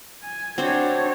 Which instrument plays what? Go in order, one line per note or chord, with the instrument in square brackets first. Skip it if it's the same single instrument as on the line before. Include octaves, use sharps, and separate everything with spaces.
[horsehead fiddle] G#5
[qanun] C4 F#4 C5 [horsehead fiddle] D4 C#5